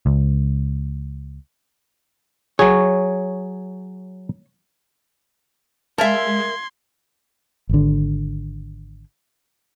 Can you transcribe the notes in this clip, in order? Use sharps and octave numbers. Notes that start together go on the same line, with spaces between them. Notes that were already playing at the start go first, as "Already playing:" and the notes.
C#2
F#3 G#4 C#5
G#3 A#4 E5 F5 G#5 A5 C6 G#6
G#1 D3